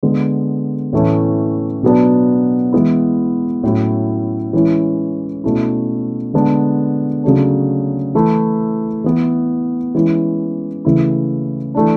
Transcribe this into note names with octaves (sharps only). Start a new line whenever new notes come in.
D3 G#3 B3
A2 E3 A3 C#4
B2 F#3 B3 D4
E3 G#3 B3 E4
A2 F#3 C#4 E4
E3 G#3 C#4 E4
B2 A3 C#4 E4
D3 G#3 B3 D4
C#3 F#3 A3 D4
E3 A3 E4
E3 B3 E4
E3 G#3 C#4 E4
C#3 E3 A3 E4
E3 A3 D4